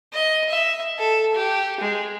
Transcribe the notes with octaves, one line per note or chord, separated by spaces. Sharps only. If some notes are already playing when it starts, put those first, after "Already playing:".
D#5
E5
A4
G4
G#3